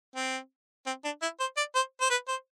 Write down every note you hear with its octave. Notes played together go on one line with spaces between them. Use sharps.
C4
C4
D4
E4
C5
D5
C5
C5
B4
C5